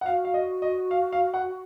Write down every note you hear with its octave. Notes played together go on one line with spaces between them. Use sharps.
F#5
F#4 F5
F5
D#5
D#5
F5
F5
F#5